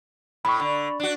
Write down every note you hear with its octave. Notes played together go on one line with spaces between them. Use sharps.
A2 B5 C#6
D3
D4 F#4